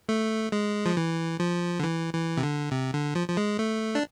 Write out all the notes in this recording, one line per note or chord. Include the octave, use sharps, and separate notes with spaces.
A3
G#3
F3
E3
F3
D3
E3
E3
C3
D3
C3
D3
F3
F3
G#3
A3
D4